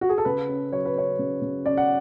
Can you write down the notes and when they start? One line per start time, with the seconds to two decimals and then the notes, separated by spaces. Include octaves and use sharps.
0.01 F#4
0.09 G#4
0.18 A4
0.25 C#3 B4
0.49 C#4
0.72 F#3 C#5
0.85 B4
0.96 C#4 C#5
1.19 C#3
1.42 C#3
1.65 C#4 D5
1.77 F#5